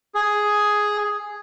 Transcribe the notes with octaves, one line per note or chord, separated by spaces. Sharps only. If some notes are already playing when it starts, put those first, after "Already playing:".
G#4